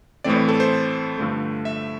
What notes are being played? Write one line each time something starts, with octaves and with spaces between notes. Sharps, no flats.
A2 E3 A3 C4 D5
D5
A4
C5
G2 D3 F3 A3
E5